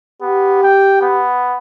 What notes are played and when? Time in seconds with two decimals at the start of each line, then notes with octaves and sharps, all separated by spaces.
0.22 B3 G4
0.63 G5
1.01 B3